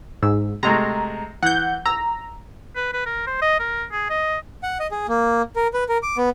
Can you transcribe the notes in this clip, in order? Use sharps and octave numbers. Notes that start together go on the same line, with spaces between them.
G#2 E6
C3 G#3 A3 A#5
E3 F#5 G6
A#5 E6
B4
B4
A#4
C5
D#5
A#4
G#4
D#5
F#5
D#5
G#4
A#3
A#4
B4
A#4
D6
B3